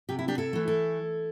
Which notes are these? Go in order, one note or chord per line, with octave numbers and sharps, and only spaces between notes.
C3 G4
E4
D4 G4
E4 A4
E3 A3
E4 A4